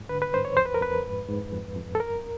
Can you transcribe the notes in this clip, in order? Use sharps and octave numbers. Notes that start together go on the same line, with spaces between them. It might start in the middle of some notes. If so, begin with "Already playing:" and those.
Already playing: G#2
D3 B4
B4
G2 C5
C#5
F2 C5
B4
A#4
F2 B4
G#2
G#2
F2
F2
A4
F#2 A#4